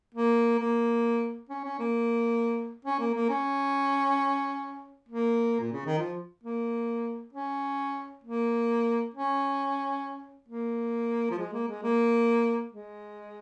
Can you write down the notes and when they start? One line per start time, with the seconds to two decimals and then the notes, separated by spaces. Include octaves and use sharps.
0.15 A#3
0.59 A#3
1.49 C#4
1.64 C#4
1.79 A#3
2.85 C#4
3.00 A#3
3.14 A#3
3.29 C#4
5.09 A#3
5.60 A#2
5.73 C#3
5.86 D#3
5.98 F3
6.43 A#3
7.33 C#4
8.24 A#3
9.14 C#4
10.48 A#3
11.30 F3
11.39 G#3
11.53 A#3
11.68 G#3
11.83 A#3
12.73 G#3